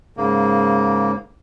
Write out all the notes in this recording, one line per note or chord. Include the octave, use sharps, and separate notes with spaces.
G#2 C#3 A#3